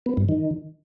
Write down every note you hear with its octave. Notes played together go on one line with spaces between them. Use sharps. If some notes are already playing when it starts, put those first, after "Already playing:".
B3
G2
D#3